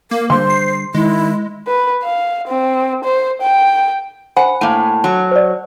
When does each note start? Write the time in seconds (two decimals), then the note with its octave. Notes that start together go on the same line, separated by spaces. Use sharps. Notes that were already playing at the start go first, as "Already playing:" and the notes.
0.11 A#3 A#4
0.30 D3 G3 C5 C6
0.50 C7
0.94 D#3 G#3 E4
1.67 B4
2.03 F5
2.48 C4
3.04 C5
3.41 G5
4.37 C5 F#5 G#5 B5
4.61 A2 A#3
5.04 F#3
5.31 C5 D5